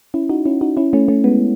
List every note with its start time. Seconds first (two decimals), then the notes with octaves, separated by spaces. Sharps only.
0.14 C#4 E4
0.29 D#4 F#4
0.46 C#4 E4
0.61 D#4 F#4
0.77 C#4 E4
0.93 A3 C#4
1.08 A3 C#4
1.24 G#3 B3